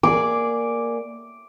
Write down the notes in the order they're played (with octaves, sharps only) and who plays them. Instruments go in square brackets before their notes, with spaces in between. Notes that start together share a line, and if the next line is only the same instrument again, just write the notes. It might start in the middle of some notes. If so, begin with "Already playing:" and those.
[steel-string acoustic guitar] A#3 G#4 D5 [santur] D6